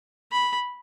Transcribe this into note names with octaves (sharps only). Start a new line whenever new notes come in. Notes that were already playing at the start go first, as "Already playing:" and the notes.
B5